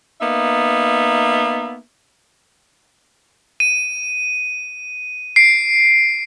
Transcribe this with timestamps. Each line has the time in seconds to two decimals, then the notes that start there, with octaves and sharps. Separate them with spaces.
0.21 A#3 B3 D#4 E5
3.60 D#7
5.36 C7 D7